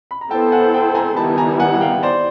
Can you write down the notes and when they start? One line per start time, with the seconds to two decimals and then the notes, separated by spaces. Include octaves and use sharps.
0.11 B5
0.21 A#5
0.31 B3 E4 A4 C5 G5 A5
0.52 F#5 G#5
0.74 G5 A5
0.95 G#5 A#5
1.16 D#3 G3 B3 E4 A5 B5
1.37 G#5 A#5
1.60 F#5 G#5
1.75 F#5
1.81 F5 G5
2.03 C5 D5